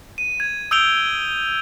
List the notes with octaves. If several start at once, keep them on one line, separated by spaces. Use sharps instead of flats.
D#7
G#6
D#6 E6 G6 D7 F7 G7